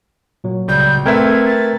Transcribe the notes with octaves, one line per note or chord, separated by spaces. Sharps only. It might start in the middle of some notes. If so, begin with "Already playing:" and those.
A#2 F#3
C#2 G3 G6
A3 C4 A#4 B4 E5 G5 G#6
A6